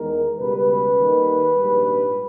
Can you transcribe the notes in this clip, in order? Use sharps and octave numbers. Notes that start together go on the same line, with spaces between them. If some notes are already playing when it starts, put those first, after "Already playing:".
Already playing: E2 D#3 G#3 A#4
C#2 B2 G3 B4
D#2 D#3 G3
A#1 G#2 G3